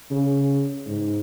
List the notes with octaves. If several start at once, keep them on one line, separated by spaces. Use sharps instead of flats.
C#3
G#2